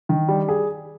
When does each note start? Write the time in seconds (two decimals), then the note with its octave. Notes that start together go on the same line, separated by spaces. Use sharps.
0.09 D#3
0.28 G3
0.49 G#4